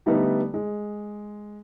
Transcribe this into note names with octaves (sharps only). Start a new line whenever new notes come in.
D3 G3 A3 B3 D#4
G#3